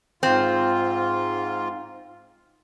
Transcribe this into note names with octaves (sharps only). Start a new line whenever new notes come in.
G#2 C4 F4